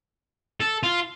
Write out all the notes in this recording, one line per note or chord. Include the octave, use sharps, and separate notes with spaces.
A4
F4